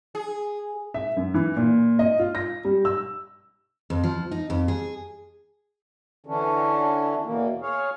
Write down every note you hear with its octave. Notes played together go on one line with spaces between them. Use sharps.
G#4
E5
F#2
E3
A#2
D#5
F4
A#6
G3
E6
F2
F3
D#4
F2
G#4
D3 E3 C#4 D4
E2 B2 E3 A#3
G#4 C#5 F5